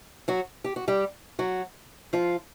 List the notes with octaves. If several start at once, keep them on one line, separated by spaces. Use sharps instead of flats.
F#3 F#4
G4
F#4
G3 G4
F#3 F#4
F3 F4